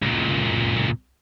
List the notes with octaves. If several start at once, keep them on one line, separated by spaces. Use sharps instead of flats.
C#2 A#2